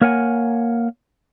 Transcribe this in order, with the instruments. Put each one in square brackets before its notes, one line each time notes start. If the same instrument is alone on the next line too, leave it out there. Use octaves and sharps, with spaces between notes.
[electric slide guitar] A#3 A#4 C#5 F#5 G#5